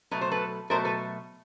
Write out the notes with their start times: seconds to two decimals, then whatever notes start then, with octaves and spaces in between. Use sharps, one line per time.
0.11 B2 F#3 A3 B4
0.21 C5
0.31 A4 B4
0.70 B2 F#3 A3 A#4 C5
0.85 A4 B4